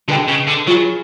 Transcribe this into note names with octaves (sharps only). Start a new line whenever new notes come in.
D3 G#4 B4 D#5 G5
C#3
D3
F#3 F4 G#4 B4